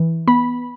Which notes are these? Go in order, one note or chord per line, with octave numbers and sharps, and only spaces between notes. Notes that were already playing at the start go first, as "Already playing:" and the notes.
Already playing: E3
B3 B5